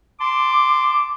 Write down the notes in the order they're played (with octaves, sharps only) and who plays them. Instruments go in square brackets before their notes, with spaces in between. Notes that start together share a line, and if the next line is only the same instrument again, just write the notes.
[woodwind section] A5 C6 D6